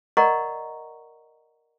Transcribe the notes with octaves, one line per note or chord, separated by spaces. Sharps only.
A#4 D5 D#5 F#5 A#5 C#6